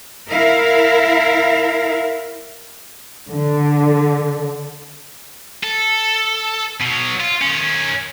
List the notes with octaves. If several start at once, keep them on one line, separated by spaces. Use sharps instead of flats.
E4 A#4 F5
D3
A4
B2 F#3
F4
D#3 C#4